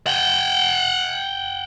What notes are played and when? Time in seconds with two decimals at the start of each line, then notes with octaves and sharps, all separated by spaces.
0.07 F#5 G5